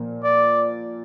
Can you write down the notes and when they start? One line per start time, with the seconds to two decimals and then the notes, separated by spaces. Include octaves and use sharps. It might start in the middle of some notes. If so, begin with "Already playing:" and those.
Already playing: A#2 F3 A#3
0.24 D5